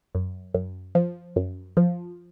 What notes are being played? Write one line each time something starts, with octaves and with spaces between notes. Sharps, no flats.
F#2
F#2
F3
F#2
F3